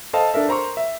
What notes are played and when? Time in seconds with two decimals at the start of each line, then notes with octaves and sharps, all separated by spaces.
0.13 A4 C5 D#5 F5 A5
0.34 D4 A4 A#4 E5
0.48 A#4 C5 A#5 C6 C#6
0.77 E5